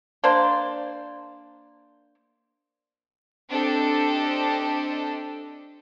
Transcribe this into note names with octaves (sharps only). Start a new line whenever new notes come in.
A#3 D4 C5 D5
C4 D4 G4 A4 D#5